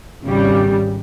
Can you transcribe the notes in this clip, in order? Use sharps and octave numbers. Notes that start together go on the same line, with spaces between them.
G#1 C#3 G3